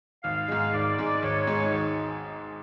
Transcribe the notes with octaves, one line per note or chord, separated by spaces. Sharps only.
G#1 F5
G#2 G#3
G#1 D5
G#2 G#3
G#1 C#5
G#2 G#3
G#1